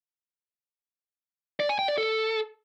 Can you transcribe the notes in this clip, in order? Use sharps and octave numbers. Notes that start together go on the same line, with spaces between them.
D5
G#5
G5
D5
A4